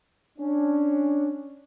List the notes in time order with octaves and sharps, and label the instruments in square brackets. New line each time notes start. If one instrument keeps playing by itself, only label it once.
[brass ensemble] C#4 D4